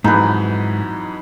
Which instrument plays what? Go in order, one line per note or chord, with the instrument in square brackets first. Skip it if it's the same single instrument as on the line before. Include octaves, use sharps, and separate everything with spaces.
[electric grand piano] F2 E3 F#3 [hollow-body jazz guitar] G#2 [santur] D#4 B4